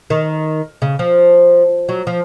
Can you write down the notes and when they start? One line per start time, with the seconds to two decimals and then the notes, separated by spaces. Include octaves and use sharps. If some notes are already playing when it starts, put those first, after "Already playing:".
0.10 D#3
0.82 C#3
0.99 F3
1.89 F#3
2.07 F3